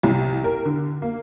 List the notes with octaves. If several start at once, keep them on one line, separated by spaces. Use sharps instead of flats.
C2
A#4
D3
A#3